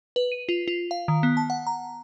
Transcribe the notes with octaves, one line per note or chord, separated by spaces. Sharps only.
B4
D#7
F4
F4
F5
D#3
B3
A5
F#5
A#5